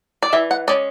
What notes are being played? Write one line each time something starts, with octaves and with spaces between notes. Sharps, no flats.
D5
E3 E5
F#5
G#3 C#4 D5